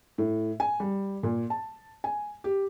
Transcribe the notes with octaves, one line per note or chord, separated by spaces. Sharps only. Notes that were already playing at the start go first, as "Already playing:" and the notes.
A2
G#5
G3
A#2
A5
G#5
G4